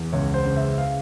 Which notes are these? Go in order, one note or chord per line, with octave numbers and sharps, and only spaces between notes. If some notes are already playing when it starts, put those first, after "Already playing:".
Already playing: E2
C#2 C#5
C5
C#3
E5
F5